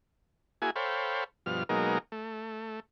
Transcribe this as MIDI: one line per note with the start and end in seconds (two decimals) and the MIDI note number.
0.62 0.70 58
0.62 0.70 64
0.62 0.70 66
0.62 0.70 68
0.62 0.70 80
0.76 1.24 69
0.76 1.24 72
0.76 1.24 73
0.76 1.24 77
0.76 1.24 79
0.76 1.24 83
1.46 1.63 43
1.46 1.63 47
1.46 1.63 53
1.46 1.63 89
1.69 1.98 47
1.69 1.98 54
1.69 1.98 56
1.69 1.98 58
1.69 1.98 63
1.69 1.98 70
2.12 2.80 57